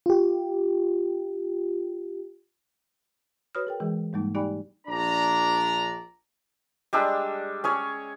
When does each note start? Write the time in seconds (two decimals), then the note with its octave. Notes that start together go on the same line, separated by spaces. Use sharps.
0.06 F4 G4
3.55 F#4 B4 C#5 B5 D#6 F6
3.67 G#4 A#4 G5
3.80 E3 G#3 G#4
4.13 G#2 B2 G3 G#3 A#3 D#4
4.35 D#4 G4 D5 G5 G#5 B5
4.87 A#1 D4 D5 A#5
6.93 G3 G#3 D4 E6
7.64 C#4 G#4 C#5